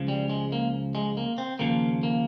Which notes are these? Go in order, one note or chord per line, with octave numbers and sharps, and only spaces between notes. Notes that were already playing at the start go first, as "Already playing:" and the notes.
Already playing: C#2 C#3 F3
G3
G#3
A#3
G#3
A#3
C4
D#2 C#3 F3 A#3
A#3